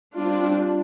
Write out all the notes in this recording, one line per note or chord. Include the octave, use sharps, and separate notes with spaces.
G3 C4 D4 F4